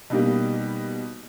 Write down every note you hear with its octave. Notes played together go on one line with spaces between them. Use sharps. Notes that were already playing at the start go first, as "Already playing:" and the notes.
B2 G3 A#3 D#4 G4